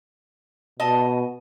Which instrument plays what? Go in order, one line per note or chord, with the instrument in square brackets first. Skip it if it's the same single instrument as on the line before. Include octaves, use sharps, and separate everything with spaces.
[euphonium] B2 [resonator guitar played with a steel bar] D#5 A5